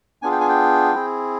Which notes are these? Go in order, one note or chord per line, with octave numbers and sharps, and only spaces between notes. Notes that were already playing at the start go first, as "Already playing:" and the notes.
B3 D4 F4 G#4 G#5
G5
G#5
G5
C4 E4 G#4